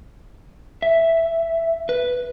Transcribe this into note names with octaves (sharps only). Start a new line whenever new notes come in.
E5
B4